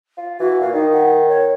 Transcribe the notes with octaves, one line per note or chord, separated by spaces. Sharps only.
F4
E3 F#4
A#2 F5
D#3 D#4
F#5
C#5